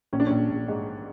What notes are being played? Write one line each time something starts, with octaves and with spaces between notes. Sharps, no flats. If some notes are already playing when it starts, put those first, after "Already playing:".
A#1 C#4
D4
A#1 C#4
A#1
G#2